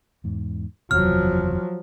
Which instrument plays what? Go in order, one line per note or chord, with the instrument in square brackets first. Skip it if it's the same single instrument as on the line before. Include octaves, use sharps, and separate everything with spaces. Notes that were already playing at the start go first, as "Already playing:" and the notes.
[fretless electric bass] E2 G#2
[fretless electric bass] F#1 E2 C3 [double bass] F3 F#3 [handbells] F6